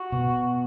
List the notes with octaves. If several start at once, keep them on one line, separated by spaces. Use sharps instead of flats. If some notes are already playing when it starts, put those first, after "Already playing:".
Already playing: F#4
B2